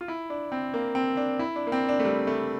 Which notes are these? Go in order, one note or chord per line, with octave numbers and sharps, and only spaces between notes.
F4
E4
D4
C4
A#3
C4
D4
E4
D4
A#3
C4
D4
A3
G3
A3